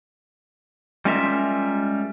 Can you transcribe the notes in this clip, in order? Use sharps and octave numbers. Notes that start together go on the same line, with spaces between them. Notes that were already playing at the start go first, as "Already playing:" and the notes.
G3 G#3 C#4 F4 A#4 E5